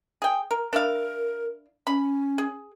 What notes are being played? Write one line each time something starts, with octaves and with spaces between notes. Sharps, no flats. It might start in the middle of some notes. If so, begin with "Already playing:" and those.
G#4 G5
A#4
D4 E4 A#4 F5
C#4 B5
G#4